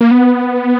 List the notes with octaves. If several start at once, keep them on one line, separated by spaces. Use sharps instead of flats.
A#3
B3